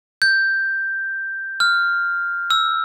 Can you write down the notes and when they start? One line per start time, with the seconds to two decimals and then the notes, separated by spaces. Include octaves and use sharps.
0.22 G6
1.60 F6
2.50 E6